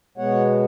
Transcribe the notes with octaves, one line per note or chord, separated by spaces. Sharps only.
B2 G#3 B3 C#5 F#5